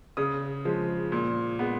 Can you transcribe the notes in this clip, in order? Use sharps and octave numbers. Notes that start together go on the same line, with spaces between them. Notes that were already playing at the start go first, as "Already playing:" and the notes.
C#3 D#6
F3 G#3
A#2
G#3 B3